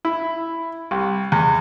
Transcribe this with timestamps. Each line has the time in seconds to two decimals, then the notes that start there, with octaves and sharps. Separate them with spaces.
0.05 E4
0.91 C2
1.32 E2